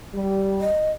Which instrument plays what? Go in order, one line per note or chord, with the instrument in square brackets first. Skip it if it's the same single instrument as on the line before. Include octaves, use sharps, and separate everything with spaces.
[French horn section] G3
[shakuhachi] D#5